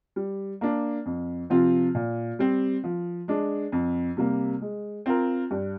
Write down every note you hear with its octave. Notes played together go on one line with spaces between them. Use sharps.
G3
A#3 D4
F2
C3 F3 C4 F4
A#2
G3 C4
F3
G#3 D4
F2
C3 G3 A#3
G#3
C4 F4 A#4
G2